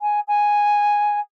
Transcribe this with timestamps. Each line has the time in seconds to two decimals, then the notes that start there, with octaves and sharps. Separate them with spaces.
0.01 G#5
0.27 G#5